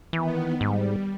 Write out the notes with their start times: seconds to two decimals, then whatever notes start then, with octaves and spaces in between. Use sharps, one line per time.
0.13 D#3 E3 B3
0.61 G#2 G3